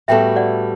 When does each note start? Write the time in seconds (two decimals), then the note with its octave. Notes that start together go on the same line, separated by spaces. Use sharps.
0.08 A2 G3 B3 F#4 A4 E5 G5
0.36 D5 F#5